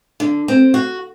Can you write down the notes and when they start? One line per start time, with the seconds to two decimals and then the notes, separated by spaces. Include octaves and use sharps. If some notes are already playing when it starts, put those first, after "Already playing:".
0.20 D3
0.48 C4
0.74 F#4